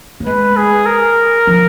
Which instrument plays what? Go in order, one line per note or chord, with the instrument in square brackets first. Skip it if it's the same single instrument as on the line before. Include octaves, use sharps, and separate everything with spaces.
[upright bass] A#3
[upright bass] G#3 [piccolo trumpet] B4
[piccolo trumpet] G#4
A#4
[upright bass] F3